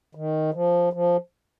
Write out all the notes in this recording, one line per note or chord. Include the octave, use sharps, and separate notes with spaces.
D#3
F3
F3